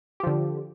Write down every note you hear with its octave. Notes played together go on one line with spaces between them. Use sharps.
D3 F3 G4